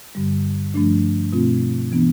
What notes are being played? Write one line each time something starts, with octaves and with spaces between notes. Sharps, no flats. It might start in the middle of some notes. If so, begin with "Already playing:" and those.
G2 D3 G3
G2 F3 A3 D4
B2 A3 C4 F4
E3 B3 D4